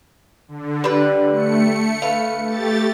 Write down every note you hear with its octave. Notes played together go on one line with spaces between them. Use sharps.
D3
G3 B4
A3 C#7
B4 F5
A3 G4 A6